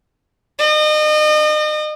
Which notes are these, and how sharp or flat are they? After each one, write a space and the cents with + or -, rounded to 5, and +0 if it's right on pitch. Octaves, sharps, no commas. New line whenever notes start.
D#5 -35